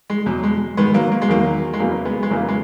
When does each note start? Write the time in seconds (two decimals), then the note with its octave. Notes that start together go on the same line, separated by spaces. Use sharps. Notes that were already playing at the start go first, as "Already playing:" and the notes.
0.10 G#3
0.26 E2 B2 F#3
0.43 G#3
0.77 G#2 D#3 G#3 B3
0.94 F#3 A#3
1.12 A#3
1.22 G#3
1.29 E2 D#3 F#3 A#3
1.73 G#3
1.79 E2 C#3 E3 F#3 A#3
2.05 G#3 B3
2.23 G#3
2.30 E2 C#3 E3 F#3 A#3
2.48 G#3